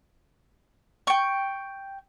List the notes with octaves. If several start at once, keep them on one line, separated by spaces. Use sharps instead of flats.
G5 C#6